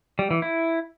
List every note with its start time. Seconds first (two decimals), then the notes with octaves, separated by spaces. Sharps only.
0.19 G3
0.31 E3
0.42 E4